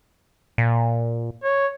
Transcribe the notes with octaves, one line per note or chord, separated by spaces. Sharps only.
A#2
C#5